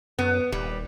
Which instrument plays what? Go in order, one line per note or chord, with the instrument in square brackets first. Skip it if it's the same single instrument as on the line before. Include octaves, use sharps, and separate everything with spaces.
[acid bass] F#2 [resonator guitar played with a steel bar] B3
[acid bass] D#1 [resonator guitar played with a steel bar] G3